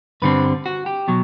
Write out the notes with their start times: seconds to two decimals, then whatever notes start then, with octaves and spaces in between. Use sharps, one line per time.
0.22 G2 D3 G3 C4 B4
0.66 F#4
0.86 G4
1.08 B2 F#3